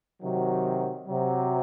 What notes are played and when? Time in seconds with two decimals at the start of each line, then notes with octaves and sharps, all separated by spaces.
0.22 C3 D#3 F#3
1.07 C3 F#3